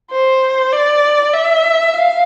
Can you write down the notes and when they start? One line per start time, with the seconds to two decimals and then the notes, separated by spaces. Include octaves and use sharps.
0.11 C5
0.72 D5
1.33 E5
1.94 F5